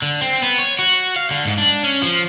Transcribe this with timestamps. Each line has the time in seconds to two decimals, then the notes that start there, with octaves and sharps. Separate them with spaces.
0.02 D3
0.21 C4
0.42 B3
0.58 C#5
0.79 F#4
1.16 F5
1.31 D3
1.45 G#2
1.58 D4
1.83 C#4
2.02 F3